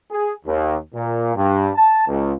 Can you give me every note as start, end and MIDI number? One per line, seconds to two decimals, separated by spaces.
0.11 0.32 68
0.46 0.77 39
0.94 1.32 46
1.36 1.69 43
1.74 2.06 81
2.08 2.33 37